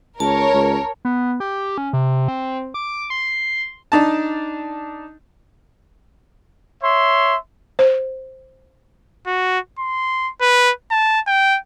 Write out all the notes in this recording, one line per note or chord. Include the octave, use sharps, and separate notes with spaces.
C#2 A#4 C#5 A5
C#2
B3
G4
C#4
C3
C4
D6
C6
D4 D#4 A5
C#5 E5 C6
C5
F#4
C6
B4
A5
G5